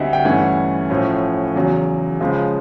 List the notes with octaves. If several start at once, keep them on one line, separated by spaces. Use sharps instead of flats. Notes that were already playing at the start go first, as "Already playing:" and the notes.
Already playing: D2 D3 G3 C4 D#5 E5 F#5
G5
G2 E3 A3 C#4 F#5 G#5
A2 F3 A3 C#4
E2 C#3 F#3
C#2 C#3 F3 G#3